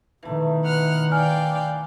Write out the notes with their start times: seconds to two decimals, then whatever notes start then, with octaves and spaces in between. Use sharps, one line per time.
0.23 B2 D#3 E3 A3
0.64 B4 F#5 F6 F#6
1.12 D5 F5 G5 G#5 F6